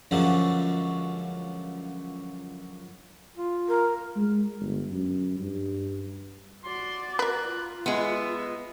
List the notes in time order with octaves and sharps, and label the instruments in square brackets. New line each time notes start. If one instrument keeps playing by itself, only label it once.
[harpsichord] C#2 F#2 D3 F3 F#3 G#3
[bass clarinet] F4
[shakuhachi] A#4
[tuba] G#3
G1
F#2
G2
[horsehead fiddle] F#4 D5 [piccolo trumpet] C6
[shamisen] A#4 B4 [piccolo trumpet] F#6
[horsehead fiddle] F4
[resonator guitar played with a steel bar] G#3 B3 [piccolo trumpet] E5